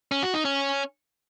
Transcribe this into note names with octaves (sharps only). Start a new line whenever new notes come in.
C#4
F#4
D#4
C#4